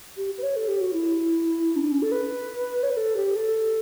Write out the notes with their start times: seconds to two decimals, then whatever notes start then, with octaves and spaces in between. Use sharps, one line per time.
0.17 G4
0.38 B4
0.43 C#5
0.56 A4
0.68 G4
0.81 F#4
0.93 E4
1.76 C#4
1.82 D4
1.92 C#4
2.02 A4
2.12 B4
2.83 C#5
2.90 B4
2.97 A4
3.17 G4
3.36 A4